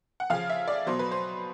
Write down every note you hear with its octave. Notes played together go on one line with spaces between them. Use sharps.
F#5
C#3 F3 F5
E5
D5
B2 F#3 C5
B4
C5